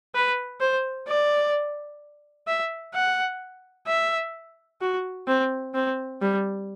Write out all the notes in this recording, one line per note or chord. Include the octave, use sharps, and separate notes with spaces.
B4
C5
D5
E5
F#5
E5
F#4
C4
C4
G3